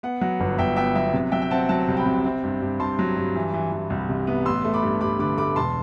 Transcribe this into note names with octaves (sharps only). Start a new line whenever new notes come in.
B3 F#5
F#3 F#5
G1
G1 E5 G5
B3 E5 G5
F#3 E5
C3
F#3 E5 G5
G5
C4 F#5 A5
F#3 F#5 A5
C2
G5 B5
C3
C4
G2
G2
G2 A5 C6
F#3
G2
E3
E3
E3
C2
C3
B3
A1 C6 E6
A3
B5 D6
G2
G2 B5 D6
D3 B5 D6
A3 B5 D6
E1 A5 C6